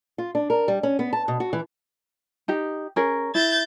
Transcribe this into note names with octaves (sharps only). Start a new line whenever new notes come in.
F4
D4
A#4
G3
C#4
B3
A5
B2
F#4
E3
D#4 G4
C#4 G#4 A#4
E4 G6 A6